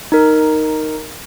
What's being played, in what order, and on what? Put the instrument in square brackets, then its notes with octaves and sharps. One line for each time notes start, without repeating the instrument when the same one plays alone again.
[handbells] D#4 A#4